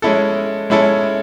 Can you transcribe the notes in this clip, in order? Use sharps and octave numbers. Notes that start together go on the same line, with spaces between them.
G#3 C#4 E4 A4
G#3 C#4 E4 A4